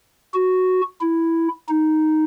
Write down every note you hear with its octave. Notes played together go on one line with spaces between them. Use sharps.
F#4
E4
D#4